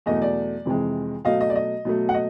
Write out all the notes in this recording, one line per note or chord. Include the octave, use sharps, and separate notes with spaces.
E2 B2 F#3 A3 D#5
D5
F2 C3 E3 G#3
B2 F#3 A3 D#5 F5
D#5
D5
D#5
B2 F#3 A3
F#5
D#5